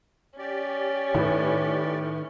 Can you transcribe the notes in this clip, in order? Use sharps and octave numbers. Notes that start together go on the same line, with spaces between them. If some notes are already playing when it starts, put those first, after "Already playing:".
C#4 G4 D5
A2 D#3 B4